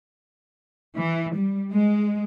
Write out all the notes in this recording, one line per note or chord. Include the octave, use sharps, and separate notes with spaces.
E3
G3
G#3